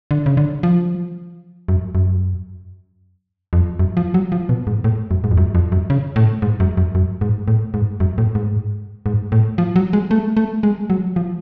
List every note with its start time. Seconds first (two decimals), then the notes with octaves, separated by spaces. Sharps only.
0.11 D3
0.26 C#3
0.37 D3
0.63 F3
1.68 F#2
1.95 F#2
3.53 F2
3.79 F#2
3.97 F3
4.14 F#3
4.32 F3
4.49 B2
4.67 G#2
4.84 A2
5.11 F#2
5.24 G#2
5.31 F2
5.37 F#2
5.55 F2
5.72 F#2
5.90 C#3
6.16 A2
6.42 G#2
6.60 F#2
6.77 F#2
6.95 F#2
7.21 G#2
7.48 A2
7.74 G#2
8.00 F#2
8.18 A2
8.35 G#2
9.06 G#2
9.32 A2
9.58 F3
9.76 F#3
9.93 G#3
10.11 A3
10.37 A3
10.63 G#3
10.90 F#3
11.16 F3